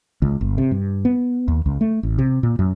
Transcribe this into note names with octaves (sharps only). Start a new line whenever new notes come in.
C#2
G1
C3
G2
B3
D#2
C#2
A3
A1
C3
A#2
F#2